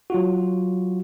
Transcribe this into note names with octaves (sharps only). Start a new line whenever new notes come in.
F#3 F4 F#4